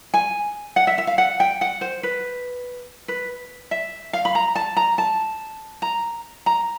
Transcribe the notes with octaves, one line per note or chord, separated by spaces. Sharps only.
G#5
F#5
E5
E5
F5
F#5
G5
F#5
C5
B4
B4
E5
F5
B5
A#5
A5
A#5
A5
A#5
A#5